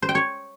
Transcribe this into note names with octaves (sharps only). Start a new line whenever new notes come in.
C5
G5
C#5